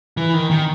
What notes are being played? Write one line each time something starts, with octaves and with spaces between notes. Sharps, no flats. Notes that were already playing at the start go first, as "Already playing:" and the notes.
E3
D#3
D#3